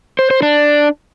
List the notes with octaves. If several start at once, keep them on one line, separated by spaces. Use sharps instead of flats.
C5
C5
D4